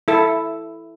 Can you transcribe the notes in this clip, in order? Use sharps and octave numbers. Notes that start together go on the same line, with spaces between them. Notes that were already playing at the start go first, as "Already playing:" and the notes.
E4 A4